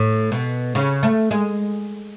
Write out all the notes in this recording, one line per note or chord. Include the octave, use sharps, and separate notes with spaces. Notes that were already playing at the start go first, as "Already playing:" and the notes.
Already playing: A2
B2
C#3
A3
G#3